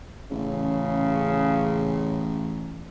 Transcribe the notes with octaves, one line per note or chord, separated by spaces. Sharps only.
A1 C#3